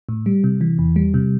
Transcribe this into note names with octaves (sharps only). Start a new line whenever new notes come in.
A2
G3
C3
E3
E2
G3
C3